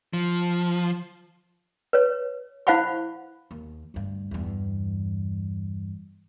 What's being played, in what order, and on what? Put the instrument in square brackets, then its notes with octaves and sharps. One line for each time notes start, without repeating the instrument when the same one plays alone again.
[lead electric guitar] F3
[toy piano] B4 C#5
E4 C5 F5 F#5 B5 C#6
[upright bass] D#2
D2 G2
E2 G2